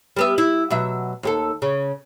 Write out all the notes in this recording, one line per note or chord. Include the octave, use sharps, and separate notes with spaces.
G3 B3 E5
E4
B2 F#3 E5
D#2 G4 A4
C#3